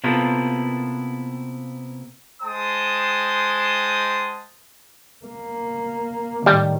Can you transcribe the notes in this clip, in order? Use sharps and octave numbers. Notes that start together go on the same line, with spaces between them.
C3 A#3 B3 E4 F4 A4
G#3 C5 G5 A5 D#6
A#3
A2 D#3 G3